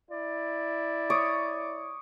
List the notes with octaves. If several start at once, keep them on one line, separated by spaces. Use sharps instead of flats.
E4 D5
C#5 D6 D#6